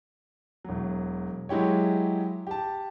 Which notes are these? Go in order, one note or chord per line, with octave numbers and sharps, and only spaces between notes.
E1 F#3
F#3 G#3 E4 G4 C#5
G4 A5